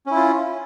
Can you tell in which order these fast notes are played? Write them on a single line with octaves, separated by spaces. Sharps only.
C#4 E4 F4